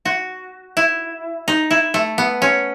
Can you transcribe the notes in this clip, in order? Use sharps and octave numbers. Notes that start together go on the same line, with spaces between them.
F#4
E4
D#4
E4
A3
B3
C#4